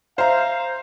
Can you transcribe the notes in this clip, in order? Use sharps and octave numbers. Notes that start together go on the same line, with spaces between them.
C5 E5 F5 A#5